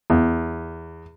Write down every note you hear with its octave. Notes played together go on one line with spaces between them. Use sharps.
E2